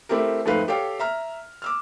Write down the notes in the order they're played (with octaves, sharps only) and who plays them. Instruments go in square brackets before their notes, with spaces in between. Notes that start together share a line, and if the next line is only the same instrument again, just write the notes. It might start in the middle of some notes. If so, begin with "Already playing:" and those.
[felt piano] A3 C4 E4 G4 A#4
F2 G#2 A3 B4 F5
G4 A4 C#5 F5 G5
E5 A#5 F6
D6 E6 F6